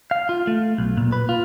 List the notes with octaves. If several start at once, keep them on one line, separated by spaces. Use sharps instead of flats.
F5
F4
A3
B1
A#2
B4
F4